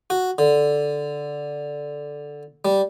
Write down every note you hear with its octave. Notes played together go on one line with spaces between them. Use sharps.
F#4
D3
G3